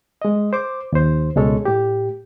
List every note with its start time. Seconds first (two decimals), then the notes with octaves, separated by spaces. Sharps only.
0.22 G#3 D#5
0.53 C5 D6
0.93 D#2 C5
1.36 C#2 B2 G#3 A4 C#5
1.65 A2 G4